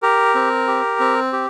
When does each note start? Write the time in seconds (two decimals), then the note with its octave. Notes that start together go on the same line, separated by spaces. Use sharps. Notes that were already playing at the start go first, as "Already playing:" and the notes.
0.02 G4 A#4
0.35 C4
0.68 G4
1.00 C4
1.33 G4